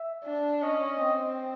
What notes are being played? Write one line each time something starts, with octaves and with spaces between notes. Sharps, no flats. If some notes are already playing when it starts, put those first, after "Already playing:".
Already playing: E5
D4
C#4 D#5
C4